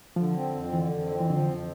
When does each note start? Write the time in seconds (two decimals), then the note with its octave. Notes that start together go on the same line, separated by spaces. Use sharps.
0.16 D3 F3
0.36 C4
0.54 F2
0.73 D3 E3
0.92 F2
1.11 C4
1.20 E3
1.30 D3 F3
1.49 F2